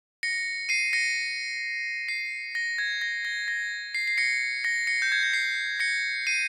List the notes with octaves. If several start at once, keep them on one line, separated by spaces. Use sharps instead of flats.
A#6 C#7
C7 D#7
A#6 C#7
C7
A#6
G#6
A#6
A#6
A#6
C7
C7
A#6 C#7
A#6 C#7
A#6 C#7
G6
G#6
A#6
C7
A#6 C#7
C7 D#7